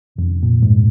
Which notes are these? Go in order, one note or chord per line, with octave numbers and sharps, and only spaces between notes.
F2
A#2
G#2